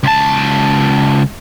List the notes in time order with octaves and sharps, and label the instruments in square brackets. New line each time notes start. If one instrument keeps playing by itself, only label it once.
[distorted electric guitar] C#2 A5